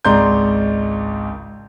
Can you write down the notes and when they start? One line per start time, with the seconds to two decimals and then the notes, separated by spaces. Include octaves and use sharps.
0.05 G#1 C#2 D5 A#5 C6 G6